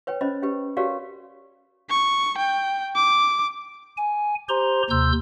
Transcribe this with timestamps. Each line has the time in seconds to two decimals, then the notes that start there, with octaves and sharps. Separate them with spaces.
0.07 B4 C#5 G5
0.21 C#4 C5 D#5 B5
0.42 C#4 G4 B4
0.77 F#4 G4 A#4 C#5 D5 F5
1.90 C#6
2.38 G5
2.96 D6
3.97 G#5
4.49 G4 C5 A#5 C6
4.90 D#2 C3 C6 E6 G6